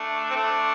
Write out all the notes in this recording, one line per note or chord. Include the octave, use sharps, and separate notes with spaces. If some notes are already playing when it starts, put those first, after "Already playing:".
Already playing: A3 D4
C4
A3 D4